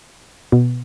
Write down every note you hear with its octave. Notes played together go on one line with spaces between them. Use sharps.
B2